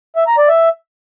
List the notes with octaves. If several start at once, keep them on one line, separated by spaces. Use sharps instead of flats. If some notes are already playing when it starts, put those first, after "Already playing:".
E5
A#5
D5
E5